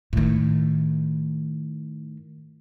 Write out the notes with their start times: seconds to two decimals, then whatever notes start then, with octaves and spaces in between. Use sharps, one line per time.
0.13 A2 D#3